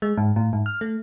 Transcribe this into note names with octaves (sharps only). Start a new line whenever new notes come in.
G#3
G#2
A2
G#2
F6
A3